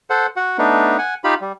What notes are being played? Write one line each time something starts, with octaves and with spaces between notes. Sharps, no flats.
A4 C5 F#5
F#4 F#5
A3 B3 D4 D#4
F#5 G#5
D#4 F4 G4 B5
G3